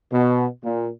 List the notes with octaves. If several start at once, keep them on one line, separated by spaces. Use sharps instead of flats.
B2
A#2